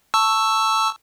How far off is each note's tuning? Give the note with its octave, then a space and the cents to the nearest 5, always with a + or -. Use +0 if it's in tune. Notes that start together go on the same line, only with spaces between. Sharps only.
A5 +5 C#6 +0 E6 +0